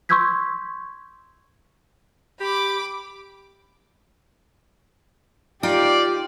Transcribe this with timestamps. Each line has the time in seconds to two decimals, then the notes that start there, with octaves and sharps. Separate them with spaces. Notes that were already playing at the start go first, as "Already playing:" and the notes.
0.09 C6 C#6 E6 G6 G#6 B6
2.40 G4 B5 D6
5.63 D#4 F4 G4 D5 G5